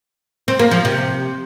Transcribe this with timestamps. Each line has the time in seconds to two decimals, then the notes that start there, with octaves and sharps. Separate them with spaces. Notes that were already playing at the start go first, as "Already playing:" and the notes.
0.48 C4
0.59 A#3
0.71 F3
0.85 C3